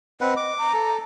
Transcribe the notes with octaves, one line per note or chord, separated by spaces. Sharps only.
C4 B4 D#5 F#5
D6
A#5
A4